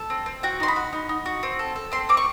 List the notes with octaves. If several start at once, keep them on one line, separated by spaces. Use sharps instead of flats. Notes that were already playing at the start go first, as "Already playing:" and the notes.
Already playing: A4
C4
C4
F#4 G5
D#4 C6
B5
F#4
D#4
D#4
F#4
C4
A4
A4
C4 C6
C4 D6
C#6